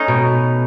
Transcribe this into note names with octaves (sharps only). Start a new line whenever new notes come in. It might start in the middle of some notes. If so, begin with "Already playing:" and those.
Already playing: A3 C#4 D#4
B2